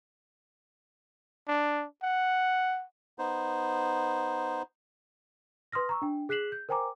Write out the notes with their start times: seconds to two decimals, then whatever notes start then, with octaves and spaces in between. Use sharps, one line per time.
1.48 D4
2.03 F#5
3.19 B3 D#4 C5
5.72 B4 C6 D#6 F6 A#6
5.89 A#5 C#6 E6
6.02 D4 G5
6.29 G#4 F#6 B6 C7 E7 F#7
6.52 G6
6.69 A#4 C5 G5 G#5 A#5 D6